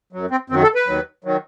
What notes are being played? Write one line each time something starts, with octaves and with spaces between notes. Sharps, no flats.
F#2 F#3
C4
F#2 D#3 F#3 C4
A4
B4
D#2 D#3 F#3
D#3 F#3